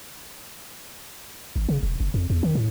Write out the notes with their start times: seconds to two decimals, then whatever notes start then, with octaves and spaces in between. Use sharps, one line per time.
1.56 G#1
1.69 C#3
1.83 E1
2.00 F#1
2.14 F2
2.30 E2
2.43 D#3
2.55 A2